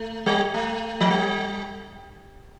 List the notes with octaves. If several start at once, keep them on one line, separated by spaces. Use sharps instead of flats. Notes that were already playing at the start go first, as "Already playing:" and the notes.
Already playing: A3
G3
A3
F3
G3